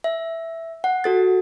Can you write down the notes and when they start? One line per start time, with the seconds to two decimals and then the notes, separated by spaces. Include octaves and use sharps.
0.04 E5
0.84 F#5
1.04 F#4 A4 A6